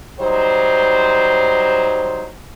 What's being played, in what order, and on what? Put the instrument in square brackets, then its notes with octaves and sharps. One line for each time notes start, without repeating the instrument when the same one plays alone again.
[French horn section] F#3 G3 D#4 C5